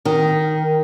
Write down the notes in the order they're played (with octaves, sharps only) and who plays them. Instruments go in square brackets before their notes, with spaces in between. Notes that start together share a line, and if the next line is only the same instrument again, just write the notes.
[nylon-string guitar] D#3